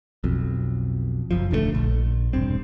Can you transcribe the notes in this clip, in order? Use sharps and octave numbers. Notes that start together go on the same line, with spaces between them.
B1 F2
F#1 F#2 F3
D#1 D3 D#3 A3
A#1
E1 G2 C4